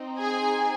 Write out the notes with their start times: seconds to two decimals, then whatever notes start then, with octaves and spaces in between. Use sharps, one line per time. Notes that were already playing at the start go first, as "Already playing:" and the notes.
Already playing: C4 D#4
0.20 G#4 G#5